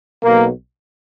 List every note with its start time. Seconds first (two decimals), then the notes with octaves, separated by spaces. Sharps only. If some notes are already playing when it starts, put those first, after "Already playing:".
0.23 B1 B2 A#3